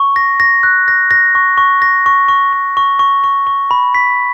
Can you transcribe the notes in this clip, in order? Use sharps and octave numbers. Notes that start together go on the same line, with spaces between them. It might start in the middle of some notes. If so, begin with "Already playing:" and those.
Already playing: C#6
A#6
A#6
F#6
A#6
A#6
C#6
C#6
A#6
C#6
C#6
C#6
C#6
C#6
C#6
C#6
B5
B6